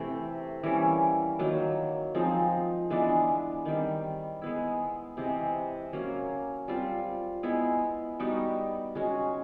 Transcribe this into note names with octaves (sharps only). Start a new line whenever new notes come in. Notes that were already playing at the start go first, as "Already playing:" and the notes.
Already playing: C3 E3 A3
E3 G3 A#3 C#4
D#3 F#3 A#3
F3 G#3 C4 D#4
E3 G#3 B3 D4
D#3 G3 C4
G#3 B3 E4
C3 E3 G#3
F#3 A#3 C#4
G3 C4 F4
G#3 B3 E4
G3 B3 D#4 F#4
G#3 C#4 F#4